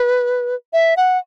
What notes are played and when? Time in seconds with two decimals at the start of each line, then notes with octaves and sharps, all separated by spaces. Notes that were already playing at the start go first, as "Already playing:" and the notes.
Already playing: B4
0.73 E5
0.97 F#5